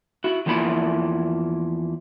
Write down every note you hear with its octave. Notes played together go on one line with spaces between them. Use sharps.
E4 F#4
E2 F3 A#3 E4 A#5 B5